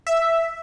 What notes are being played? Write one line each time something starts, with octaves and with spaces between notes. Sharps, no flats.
E5